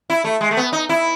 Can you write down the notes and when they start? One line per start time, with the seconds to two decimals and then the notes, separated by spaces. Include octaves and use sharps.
0.10 E4
0.24 A3
0.41 G#3
0.51 A3
0.57 B3
0.73 D#4
0.89 E4